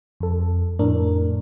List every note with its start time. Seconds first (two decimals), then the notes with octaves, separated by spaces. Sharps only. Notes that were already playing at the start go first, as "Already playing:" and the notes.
0.20 F2 A4
0.79 F2 A2 D4 A#4